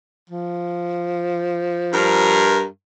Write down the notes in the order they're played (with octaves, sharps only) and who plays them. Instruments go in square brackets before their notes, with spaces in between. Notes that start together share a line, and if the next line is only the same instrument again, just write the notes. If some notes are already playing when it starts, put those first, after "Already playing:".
[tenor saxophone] F3
[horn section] G2 A#4